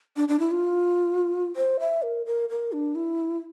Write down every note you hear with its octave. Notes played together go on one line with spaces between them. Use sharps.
D4
D4
E4
F4
C5
E5
A#4
A#4
A#4
D4
E4